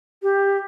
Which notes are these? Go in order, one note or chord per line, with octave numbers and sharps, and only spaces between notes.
G4